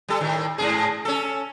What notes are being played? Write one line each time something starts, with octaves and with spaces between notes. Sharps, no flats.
G3 A4
A2 D#3
G#2 B2 G#4
C#4 A4